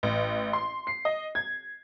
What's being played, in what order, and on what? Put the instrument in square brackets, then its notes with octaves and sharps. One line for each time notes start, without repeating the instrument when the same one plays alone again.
[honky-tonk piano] A1
C6
C7
D#5
G#6